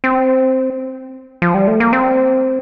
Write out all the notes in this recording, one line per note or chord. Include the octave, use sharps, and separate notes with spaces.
C4
F3
G3
A3
A#3
C4